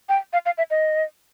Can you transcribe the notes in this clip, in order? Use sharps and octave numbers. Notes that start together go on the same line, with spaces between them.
G5
F5
F5
E5
D#5